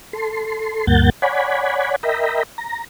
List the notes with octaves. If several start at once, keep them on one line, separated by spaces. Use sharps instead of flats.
A4 C6
D2 G2 A#3 F#5 G6 A6
C#5 D5 F#5 G#5 B5
A#4 D#5 E5 G5 A#5 B5
A#5